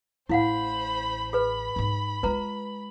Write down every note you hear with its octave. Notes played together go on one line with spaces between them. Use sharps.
A1 A2 E4 C5 F5 F#5 B5
G#4 B4 B5
G#2 D#4
G#3 F4 B4 A#5